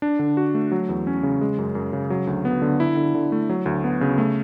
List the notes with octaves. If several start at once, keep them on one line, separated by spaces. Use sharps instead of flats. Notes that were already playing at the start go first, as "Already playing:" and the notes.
D4
D3
F#4
A3
F#3
E2
C#4
C#3
G#3
F#2
F#2
C#3
F#3
D2
B3
D3
E4
D3
D3
A3
F#3
D2
B3
C#3
A3